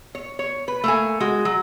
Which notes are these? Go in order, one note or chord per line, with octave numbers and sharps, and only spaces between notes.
C#5
C#5
B4
A3 A#3 G#5
G#3 F#4
F#3